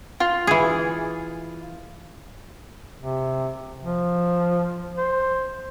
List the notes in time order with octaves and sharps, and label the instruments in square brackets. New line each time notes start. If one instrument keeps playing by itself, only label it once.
[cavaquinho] F4
[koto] E3 G#4
[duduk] C3
F3
C5